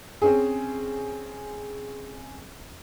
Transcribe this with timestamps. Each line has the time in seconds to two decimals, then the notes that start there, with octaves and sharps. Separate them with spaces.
0.22 C4 C#4 G#4